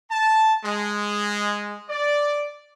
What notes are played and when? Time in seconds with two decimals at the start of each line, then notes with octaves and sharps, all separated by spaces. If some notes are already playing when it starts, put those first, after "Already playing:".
0.11 A5
0.65 G#3
1.89 D5